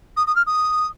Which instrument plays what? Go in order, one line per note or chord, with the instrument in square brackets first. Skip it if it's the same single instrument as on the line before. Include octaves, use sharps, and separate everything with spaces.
[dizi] D#6
D#6
F6
D#6